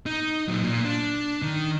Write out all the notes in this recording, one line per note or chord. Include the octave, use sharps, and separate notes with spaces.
D#4
A#2 F#3
A#2
D4
D#3